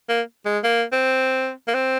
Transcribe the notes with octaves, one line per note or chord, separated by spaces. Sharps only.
A#3
G#3
A#3
C4
A#3
C4